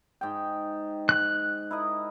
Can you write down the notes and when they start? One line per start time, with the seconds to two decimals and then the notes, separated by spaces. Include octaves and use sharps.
0.21 G#2 G5
1.09 F#6
1.71 E4 A#4 D#5